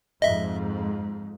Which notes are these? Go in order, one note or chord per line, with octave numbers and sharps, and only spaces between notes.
F2 G#2 D#5 E5